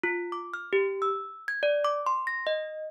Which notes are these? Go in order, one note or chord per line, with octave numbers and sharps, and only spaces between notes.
F4
D6
F6
G4
E6
G#6
D5
D6
C6
A#6
D#5